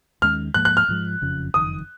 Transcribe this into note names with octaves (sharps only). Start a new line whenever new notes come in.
D#2 D#3 G#3 C#4 F6
G#2 F3 A#3 F#6
F#6
F6
G#2 F3 G#3
F#1 F2 C#3 F3
F#1 F2 D#3 D#6